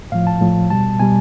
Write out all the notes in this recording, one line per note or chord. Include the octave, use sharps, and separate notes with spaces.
A2 F3 F5
A5
A2 F3
B2 G3 A5
B2 G3 G#5